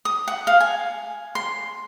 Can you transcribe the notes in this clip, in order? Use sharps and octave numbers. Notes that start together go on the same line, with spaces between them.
D#6
F#5
F5
G#5
C6